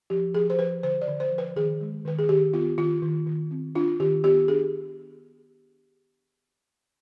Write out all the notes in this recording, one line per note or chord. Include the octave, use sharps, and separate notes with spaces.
F3 G4
F3 G#4
C5
F3 B4
D3 C5
D5
D3
C5
F3
B4
D#3 G#4
G#3
D#3 B4
G#4
D#3 G4
B3 F4
D#3 F4
D#3
D#3
C4
D4 F4
D#3 G4
B3 G4
D4 G#4